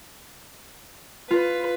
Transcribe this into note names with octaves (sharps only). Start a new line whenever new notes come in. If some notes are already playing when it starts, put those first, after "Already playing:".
F4 B4